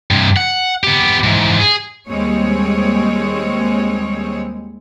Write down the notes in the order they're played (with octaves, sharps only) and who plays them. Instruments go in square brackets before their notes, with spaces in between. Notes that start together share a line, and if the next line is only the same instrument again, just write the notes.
[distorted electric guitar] G2 C3
F#5
B3 G4
G#2 E3
G#4
[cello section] D#2 G3 G#3 C4 C#5